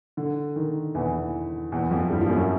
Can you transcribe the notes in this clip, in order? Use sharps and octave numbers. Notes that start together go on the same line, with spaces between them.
D3
D#3
E2 E3
E2 E3
F2 F3
G2 G3
F3
F#2 F#3